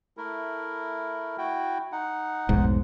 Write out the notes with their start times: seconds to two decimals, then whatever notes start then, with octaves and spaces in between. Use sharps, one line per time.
0.17 A3 E4 A#4
1.38 E4 F#4 G5
1.92 D#4 F#5
2.49 F1 B1 G#2